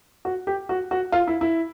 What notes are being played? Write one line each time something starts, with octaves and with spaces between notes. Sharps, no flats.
F#4
G4
F#4
F#4
F4
E4
E4